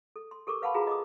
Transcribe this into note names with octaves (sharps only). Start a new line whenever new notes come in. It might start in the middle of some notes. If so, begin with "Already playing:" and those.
A4
C6
G4 A4 A#4 C#6 D6
B4 F5 F#5 A5 B5 C6
F4 F#4 G#4 A#5
D#5 D6 D#6